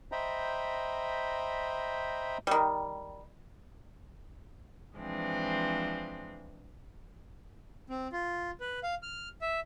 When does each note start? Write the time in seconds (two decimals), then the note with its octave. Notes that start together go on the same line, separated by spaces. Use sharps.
0.12 C5 D#5 E5 G5 A#5 B5
2.47 D#3 G3
4.97 E3 F3 G#3 C4 D4
7.89 C4
8.12 F4
8.60 B4
8.83 F5
9.03 F6
9.41 E5